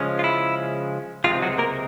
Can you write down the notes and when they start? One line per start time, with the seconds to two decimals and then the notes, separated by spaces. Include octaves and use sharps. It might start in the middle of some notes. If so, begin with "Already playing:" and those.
Already playing: C#3 F3 G#3 C#4
0.19 F4
0.24 E4
1.24 C#2 C3 F3 G#3 C4 F4
1.42 F#3 F#4
1.58 A#3 A#4